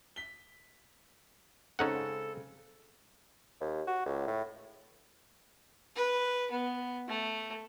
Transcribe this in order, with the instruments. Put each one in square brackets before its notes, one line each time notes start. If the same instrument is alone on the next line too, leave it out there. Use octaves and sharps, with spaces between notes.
[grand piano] B6 G7
[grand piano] C#3 G#3 C4 [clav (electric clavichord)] C#4 D#4 F#5 [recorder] A4
[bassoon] D#2
F#4
C#2
A2
[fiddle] B4
B3
A3